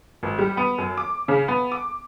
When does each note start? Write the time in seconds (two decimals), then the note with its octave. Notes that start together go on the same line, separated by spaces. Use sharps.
0.23 G#1
0.38 G3
0.57 B3
0.78 F#2
0.98 D6
1.28 C#3
1.48 B3
1.72 D6